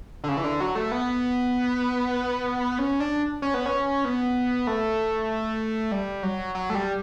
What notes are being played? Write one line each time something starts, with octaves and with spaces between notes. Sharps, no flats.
D3
C#3
E3
D3
F#3
A3
B3
C#4
D4
C#4
B3
C#4
B3
A3
G3
F#3
F#3
A3
G3